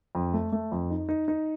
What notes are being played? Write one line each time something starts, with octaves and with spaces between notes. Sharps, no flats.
F2
A3
A3
F2
D#4
D#4
D#4